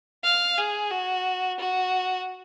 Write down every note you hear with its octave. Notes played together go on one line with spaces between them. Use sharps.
F5
G#4
F#4
F#4